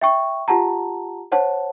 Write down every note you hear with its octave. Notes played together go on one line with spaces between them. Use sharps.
E5 G5 C#6
F4 G4 F#5 A5 A#5
C5 C#5 F#5 A5